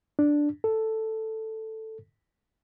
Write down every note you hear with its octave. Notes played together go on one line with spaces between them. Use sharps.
D4
A4